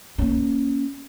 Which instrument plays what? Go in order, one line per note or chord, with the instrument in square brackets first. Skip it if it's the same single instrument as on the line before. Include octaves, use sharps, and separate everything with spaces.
[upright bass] A#3 C#4